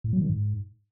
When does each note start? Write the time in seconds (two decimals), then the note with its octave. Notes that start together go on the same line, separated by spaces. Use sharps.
0.04 A2
0.13 F#3
0.21 D#3
0.29 G#2